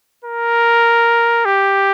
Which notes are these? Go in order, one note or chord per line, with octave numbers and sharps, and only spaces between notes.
A#4
G4